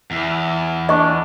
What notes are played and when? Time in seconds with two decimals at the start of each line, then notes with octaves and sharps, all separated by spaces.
0.11 E2
0.89 D4 D#5 C#6